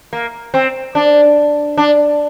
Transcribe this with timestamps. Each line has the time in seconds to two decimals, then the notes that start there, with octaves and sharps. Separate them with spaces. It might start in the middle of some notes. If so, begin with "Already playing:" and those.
0.13 A#3
0.54 C4
0.95 D4
1.78 D4